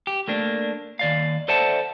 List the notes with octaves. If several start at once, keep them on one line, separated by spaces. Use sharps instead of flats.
G4
A3 A#3 D4
D#2 D5 F5
A4 C5 D5 E5 F#5 A5